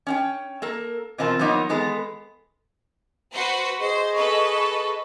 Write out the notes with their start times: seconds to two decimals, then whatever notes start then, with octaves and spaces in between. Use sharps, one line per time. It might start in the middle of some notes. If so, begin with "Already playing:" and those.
0.07 C#4 D4 G5
0.62 A#3 A4 A#4
1.18 B2 E3 C4 F4 A#4 A5
1.39 F3 F#3 A#3 B3 D#4
1.69 E3 G#3 B3 A4 A#5
3.33 F#4 B4 C5
3.79 G#4 C5 D#5 C#6
4.17 A4 B4